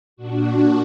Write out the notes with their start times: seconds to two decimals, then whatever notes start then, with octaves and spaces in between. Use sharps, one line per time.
0.16 A#2 D4 F#4